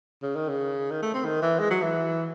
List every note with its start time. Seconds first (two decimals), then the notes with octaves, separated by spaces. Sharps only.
0.22 C#3
0.36 D#3
0.49 C#3
0.91 D#3
1.02 A3
1.14 C4
1.25 D#3
1.42 E3
1.59 G#3
1.71 F#3
1.82 E3